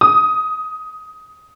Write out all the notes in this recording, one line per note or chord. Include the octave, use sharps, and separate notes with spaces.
D#6